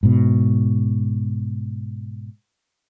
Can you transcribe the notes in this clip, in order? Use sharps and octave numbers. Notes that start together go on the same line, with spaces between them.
G#2 B2